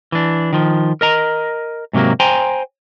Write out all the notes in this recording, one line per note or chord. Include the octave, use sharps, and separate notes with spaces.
E3 D4
D#3 F3
A#4 D#5 A#5
G#2 C3 F#3 A#3
C5 G5 G#5 A#5 C6